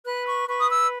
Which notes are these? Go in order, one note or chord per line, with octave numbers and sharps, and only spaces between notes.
B4 F#6
C#6
B4 C#6
D#6
E6